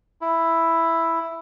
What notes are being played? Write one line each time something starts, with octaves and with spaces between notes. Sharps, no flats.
E4